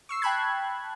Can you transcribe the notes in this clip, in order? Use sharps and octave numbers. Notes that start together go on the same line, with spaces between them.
C#6 E6 C7
G5 A5 B5 F#6 G#6